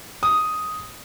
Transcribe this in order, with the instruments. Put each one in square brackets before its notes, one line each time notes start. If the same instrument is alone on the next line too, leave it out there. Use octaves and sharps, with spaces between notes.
[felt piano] D#6